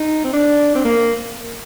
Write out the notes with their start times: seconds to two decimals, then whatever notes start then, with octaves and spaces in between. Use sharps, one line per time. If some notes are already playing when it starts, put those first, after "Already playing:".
Already playing: D#4
0.24 C4
0.33 D4
0.75 C4
0.84 A#3